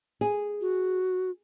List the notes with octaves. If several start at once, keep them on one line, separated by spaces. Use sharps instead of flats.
G#4
F#4